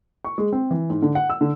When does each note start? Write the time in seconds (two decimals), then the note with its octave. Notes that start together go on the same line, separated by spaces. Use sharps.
0.25 C#6
0.38 G#3
0.53 C4
0.71 E3
0.90 G#2
1.02 D3
1.15 F#5
1.30 E6
1.41 D3